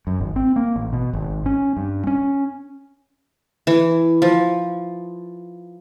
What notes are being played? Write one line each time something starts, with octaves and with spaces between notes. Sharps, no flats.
F#2
G#1
C4
A#3
A1
B2
G#1
C#4
G2
C#4
E3
F3